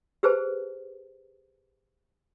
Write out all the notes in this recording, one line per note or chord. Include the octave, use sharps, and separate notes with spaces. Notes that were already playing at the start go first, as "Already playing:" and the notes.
G4 G#4 B4 C5 A5